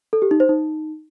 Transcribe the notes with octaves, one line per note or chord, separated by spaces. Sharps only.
A4
G4
D#4
C5
D#4